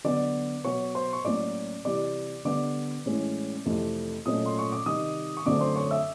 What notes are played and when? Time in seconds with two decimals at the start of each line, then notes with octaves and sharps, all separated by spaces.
0.04 D3 F#3 B3 D5 D6
0.65 B2 F#3 B3 C#5 C#6
0.95 C5 C6
1.13 C#6
1.25 A2 F#3 A#3 C#4 D5 D6
1.85 C3 E3 G3 D5 D6
2.45 D3 G3 B3 D5 D6
3.06 A2 E3 G#3 C#4
3.66 F2 C3 E3 A3
4.25 A#2 F#3 A3 C#4 D#5 D#6
4.46 C6
4.59 C#6
4.72 D6
4.86 C3 D#3 G3 D#5 D#6
5.37 C#6
5.46 F#2 D3 F#3 A3 C4 D5 D6
5.60 C5 C6
5.76 C#5 C#6
5.91 E5 E6